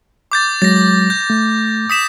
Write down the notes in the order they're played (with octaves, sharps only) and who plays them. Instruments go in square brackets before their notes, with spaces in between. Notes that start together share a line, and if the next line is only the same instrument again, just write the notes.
[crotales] D6 G6 A6
[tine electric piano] F#3 G#3 [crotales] A6 A#6
[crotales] G6
[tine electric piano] A3
[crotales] D#6 B6 E7